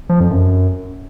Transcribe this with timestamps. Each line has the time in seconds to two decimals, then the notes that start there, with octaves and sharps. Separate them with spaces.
0.09 F3
0.20 F2
0.31 F#2